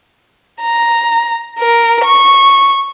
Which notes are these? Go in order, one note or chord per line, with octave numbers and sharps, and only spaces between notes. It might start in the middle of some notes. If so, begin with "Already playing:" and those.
A#5
A#4
C#6